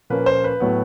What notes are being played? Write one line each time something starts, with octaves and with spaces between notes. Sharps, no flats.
A#2 F3 A#3 C#4 B4
C5
B4
A2 F#3 B3